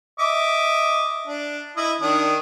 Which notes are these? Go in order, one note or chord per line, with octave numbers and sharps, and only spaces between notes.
D#5 E5 D6
D4
E4 D#5
D#3 D4 D#6